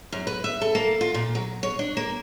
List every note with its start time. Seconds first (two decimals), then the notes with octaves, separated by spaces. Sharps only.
0.12 F#2
0.27 B4
0.44 E5
0.61 A4
0.75 A#3
1.01 F4
1.14 A#2
1.35 F#3
1.63 C#5
1.79 D4
1.97 A#3